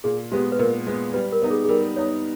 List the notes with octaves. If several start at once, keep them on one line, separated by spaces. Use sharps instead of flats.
A#2 G#4
G#3 B3 G4
B4
A#2 A#4
G#3 B3
G3 B4
A#4
B3 D#4
G#4
G#4
G3 A#4
B3 D#4 C#5